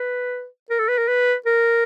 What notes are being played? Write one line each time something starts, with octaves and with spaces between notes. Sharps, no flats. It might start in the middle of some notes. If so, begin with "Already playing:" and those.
Already playing: B4
A#4
A4
B4
A#4
B4
A#4